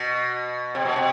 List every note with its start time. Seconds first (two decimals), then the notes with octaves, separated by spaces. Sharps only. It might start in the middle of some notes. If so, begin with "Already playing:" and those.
Already playing: B2
0.75 C3
0.85 B2
0.96 C3